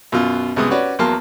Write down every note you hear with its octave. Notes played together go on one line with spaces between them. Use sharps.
F#2 B2 F4
C2 F#2 G#3 B3 D#6
C#4 F#4 B4 C#5 D5
E2 F#3 A#3 A5 C6 F6